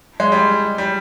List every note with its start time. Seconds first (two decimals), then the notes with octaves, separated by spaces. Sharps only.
0.20 G#3
0.32 G3
0.78 G3